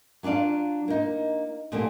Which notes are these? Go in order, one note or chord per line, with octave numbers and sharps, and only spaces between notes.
F#3 D4 F4 D5 F5
A#3 D#4
A#2 D3 F3 G3 A#3 C4